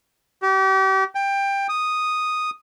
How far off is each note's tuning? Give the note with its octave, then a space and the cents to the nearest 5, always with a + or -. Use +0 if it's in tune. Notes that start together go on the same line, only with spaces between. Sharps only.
G4 -35
G5 +15
D#6 -5